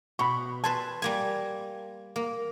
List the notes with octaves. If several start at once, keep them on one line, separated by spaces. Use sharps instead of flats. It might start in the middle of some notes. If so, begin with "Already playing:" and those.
B2 B5 C#6
B4 C5 G#5 A5
G3 A#3 G#5
A#3